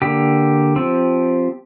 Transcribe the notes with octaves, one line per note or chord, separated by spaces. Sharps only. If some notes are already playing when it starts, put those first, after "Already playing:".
D3 A#3 G4
F3 C4